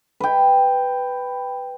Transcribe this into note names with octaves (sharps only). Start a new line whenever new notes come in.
B4 G5